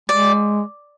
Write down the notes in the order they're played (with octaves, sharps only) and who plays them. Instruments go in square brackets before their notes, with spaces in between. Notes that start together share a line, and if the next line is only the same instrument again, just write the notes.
[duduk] G#3 [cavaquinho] D5